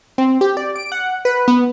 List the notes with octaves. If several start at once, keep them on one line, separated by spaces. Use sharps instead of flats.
C4
G4
D5
D7
F#5
B4
B3